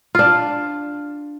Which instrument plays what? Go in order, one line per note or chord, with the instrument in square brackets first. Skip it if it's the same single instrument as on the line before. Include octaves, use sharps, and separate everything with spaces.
[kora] D4 F4